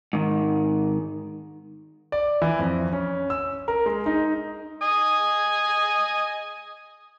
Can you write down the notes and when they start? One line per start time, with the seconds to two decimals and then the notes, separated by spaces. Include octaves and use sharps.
0.13 G#2 D#3
2.12 D5
2.42 E3
2.59 F2
2.92 C#4
3.30 E6
3.68 A#4
3.86 G#3
4.06 D#4
4.82 D#5 G#5 D#6